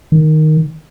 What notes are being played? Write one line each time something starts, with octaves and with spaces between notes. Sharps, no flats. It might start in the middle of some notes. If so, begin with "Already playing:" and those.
D#3